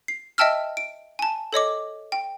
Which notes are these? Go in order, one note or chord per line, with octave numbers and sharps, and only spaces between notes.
C7
D#5 E5 G5 A5 E6 F6
D7
G#5 A5
A4 C#5 D#5 D6
G5